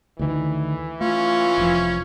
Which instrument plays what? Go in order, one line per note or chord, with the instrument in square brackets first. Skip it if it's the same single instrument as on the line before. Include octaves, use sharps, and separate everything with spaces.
[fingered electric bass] D2 D#3 [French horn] E3
[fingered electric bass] A3 [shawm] C#4 [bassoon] F4
[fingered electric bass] F1 F3